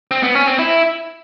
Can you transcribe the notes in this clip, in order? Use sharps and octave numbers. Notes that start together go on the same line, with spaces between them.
C4
B3
C#4
C4
E4